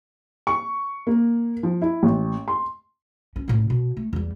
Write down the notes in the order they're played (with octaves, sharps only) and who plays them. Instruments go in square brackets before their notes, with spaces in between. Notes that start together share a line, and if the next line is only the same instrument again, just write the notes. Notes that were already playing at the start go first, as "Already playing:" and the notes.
[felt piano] C#6
A#3
F3
E4
A1
C6
[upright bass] C#4
D#1 A2
B2
A3
E2 G3